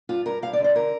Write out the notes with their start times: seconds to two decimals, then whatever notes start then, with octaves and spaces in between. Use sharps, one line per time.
0.09 G2 F4
0.26 G2 A#4
0.42 G2 F5
0.53 D5
0.59 D3
0.64 C5
0.76 A#4